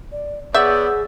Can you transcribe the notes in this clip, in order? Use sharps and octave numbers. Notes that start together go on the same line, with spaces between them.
D5
B3 G#4 C#5 D5 E5 F#5 E6 G6